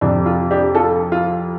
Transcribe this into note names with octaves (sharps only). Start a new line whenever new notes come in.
F2 C3 D4
F4
D4 G4
F4 A4
F4